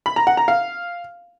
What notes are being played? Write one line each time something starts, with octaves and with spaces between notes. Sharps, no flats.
B5
A#5
F#5
A#5
F5